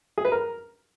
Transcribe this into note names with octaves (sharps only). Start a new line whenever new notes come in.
G#4
B4
A#4